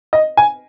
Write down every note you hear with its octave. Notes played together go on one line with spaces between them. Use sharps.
D#5
G#5